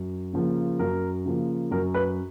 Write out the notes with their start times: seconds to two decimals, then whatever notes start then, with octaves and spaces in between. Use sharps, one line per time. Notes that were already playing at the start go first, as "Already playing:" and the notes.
Already playing: F#2
0.33 C#3 F3 A#3
0.79 F#2 A#4
1.25 C#3 F3 A#3
1.71 F#2 A#4
1.94 B4